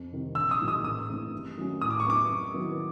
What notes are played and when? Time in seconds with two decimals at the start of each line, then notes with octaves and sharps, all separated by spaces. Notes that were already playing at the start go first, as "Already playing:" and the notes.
Already playing: F2
0.12 C3 D#3 G3 C4
0.35 A#1 E6
0.51 D#6
0.60 G#2 D#3 F#3 A#3
0.68 D#6
0.84 A1 D#6
1.08 G2 E3 A3 C4
1.33 G2
1.57 D#3 F#3 A3 C#4
1.81 A2 D#6
1.91 D6
2.00 C#6
2.05 F#3 B3 D4 D6
2.29 F#2
2.54 D#3 F#3 B3 E4